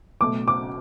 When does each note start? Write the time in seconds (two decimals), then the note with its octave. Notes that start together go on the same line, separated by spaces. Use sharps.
0.21 B2 F#3 A3 D6
0.48 D6